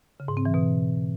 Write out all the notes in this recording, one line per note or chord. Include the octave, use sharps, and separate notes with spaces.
C#3
G#2
C4
E3
B2